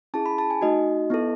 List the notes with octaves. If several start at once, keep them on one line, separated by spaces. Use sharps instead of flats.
C#4 E4 G#4 A5
B5
A5
G#5
A3 D#4 F#4 D#5
B3 E4 A4